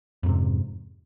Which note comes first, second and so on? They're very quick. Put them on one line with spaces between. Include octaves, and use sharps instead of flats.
F2 G#2 C3